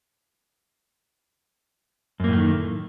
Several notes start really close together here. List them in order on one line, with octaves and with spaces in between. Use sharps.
F#2 A#3 A2 A3 D#3